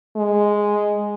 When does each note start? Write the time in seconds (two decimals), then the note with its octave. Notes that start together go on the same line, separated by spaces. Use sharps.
0.16 G#3